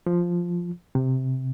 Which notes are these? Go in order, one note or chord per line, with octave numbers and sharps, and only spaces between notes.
F3
C3